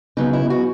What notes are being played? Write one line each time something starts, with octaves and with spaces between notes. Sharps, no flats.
C#3 F#3 B3 D#4
E4
F#4